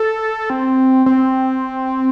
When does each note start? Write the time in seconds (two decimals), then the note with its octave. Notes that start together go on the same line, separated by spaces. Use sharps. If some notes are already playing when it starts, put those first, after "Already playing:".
Already playing: A4
0.50 C4
1.06 C4